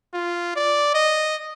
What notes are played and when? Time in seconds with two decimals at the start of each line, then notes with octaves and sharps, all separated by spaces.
0.13 F4
0.56 D5
0.94 D#5